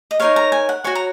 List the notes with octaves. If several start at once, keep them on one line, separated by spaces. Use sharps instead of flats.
D#5
D#4 A#4 C#5 F5
A#5
G#5
F#5
F#4 C#5 G#5
A#5